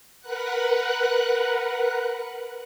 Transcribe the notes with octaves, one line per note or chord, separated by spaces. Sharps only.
A#4 B4 F#5 F#6